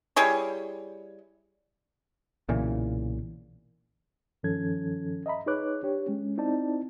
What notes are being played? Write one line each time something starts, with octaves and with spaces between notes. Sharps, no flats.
G3 E4 G#4 C#5
B1 A#2 C#3 E3
G2 D#3 F3 C#4 A4 G#6
D#5 E5 A#5 B5
D#4 G#4 B4 C#5 D6 F#6
D4 G4 C#5
G#3 C#4
C4 D#4 E4 D5 A5